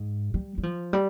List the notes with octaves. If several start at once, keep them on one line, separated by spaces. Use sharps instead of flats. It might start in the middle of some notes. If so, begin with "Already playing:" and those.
Already playing: G#2
G3
G3
F3
G3